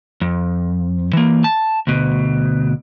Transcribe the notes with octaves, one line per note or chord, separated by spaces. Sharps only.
F2
E3 A#3
A5
D2 B2